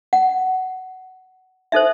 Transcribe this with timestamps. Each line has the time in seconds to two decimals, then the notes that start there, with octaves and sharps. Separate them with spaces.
0.13 F#5
1.72 D#4 A4 C5 E5